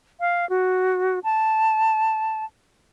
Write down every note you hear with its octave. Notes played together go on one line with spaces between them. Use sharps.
F5
F#4
A5